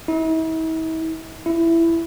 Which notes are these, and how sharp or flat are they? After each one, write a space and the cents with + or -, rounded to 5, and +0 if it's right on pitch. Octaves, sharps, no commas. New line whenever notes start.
E4 -45
E4 +10